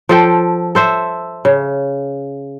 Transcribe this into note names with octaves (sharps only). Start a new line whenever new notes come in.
F3 A4 G5
A4 C5 E5
C#3